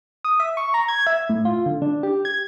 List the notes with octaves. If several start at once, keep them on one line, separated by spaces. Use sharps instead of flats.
D#6
E5
C#6
A#5
G#6
E5
A2
F4
D3
D4
G4
G#6